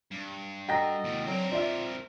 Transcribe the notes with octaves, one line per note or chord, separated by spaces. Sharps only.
G2
F#4 A4 D#5 G5 A#5 A#6
E2 A2
D3 F#3 C4 A#4
F4 D5 E5